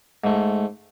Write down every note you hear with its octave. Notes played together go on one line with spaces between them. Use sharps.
G#2 A3